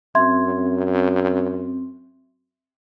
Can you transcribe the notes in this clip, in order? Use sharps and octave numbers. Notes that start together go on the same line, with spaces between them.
F#2 C4 E5 C6 G#6